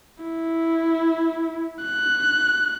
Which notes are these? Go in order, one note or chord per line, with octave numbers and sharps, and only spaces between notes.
E4
F#6